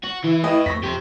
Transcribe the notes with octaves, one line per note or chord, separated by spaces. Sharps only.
F#4
E3 E4
A2 B4 D#5 G5
F2 C#6 A#6 B6
F2 G4 C5